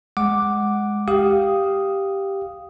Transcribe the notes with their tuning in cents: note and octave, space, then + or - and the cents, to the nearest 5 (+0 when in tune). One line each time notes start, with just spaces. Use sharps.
G#3 +0 F#5 +0 D6 +0
G4 +0 F5 +0 D#6 +0